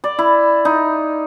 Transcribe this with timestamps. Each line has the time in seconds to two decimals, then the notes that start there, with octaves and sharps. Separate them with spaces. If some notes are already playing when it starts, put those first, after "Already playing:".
0.04 D5
0.19 E4
0.65 D#4